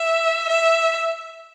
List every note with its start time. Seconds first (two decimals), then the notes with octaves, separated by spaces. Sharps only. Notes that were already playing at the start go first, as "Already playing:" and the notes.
Already playing: E5
0.49 E5